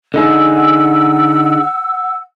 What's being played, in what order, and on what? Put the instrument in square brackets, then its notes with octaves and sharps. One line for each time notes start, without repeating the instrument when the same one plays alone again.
[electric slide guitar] D3 D#4 G#4 [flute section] F#5 E6